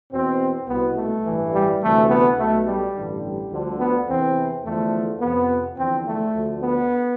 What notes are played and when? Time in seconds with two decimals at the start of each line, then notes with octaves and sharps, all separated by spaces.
0.11 E2 B2 C4
0.68 C2 B2 B3
0.96 A3
1.25 A1 G2 E3
1.53 G3
1.81 D2 C3 E3 A3
2.09 B3
2.38 B1 B2 A3
2.67 G3
2.95 A1 G2 D3
3.23 G3
3.51 D2 D3 F3
3.79 B3
4.08 E2 C3 E3 C4
4.64 E2 D3 F3 A3
5.21 F2 C3 F3 B3
5.77 E2 D3 F3 C4
6.06 A3
6.33 D2 D3 F3
6.62 B3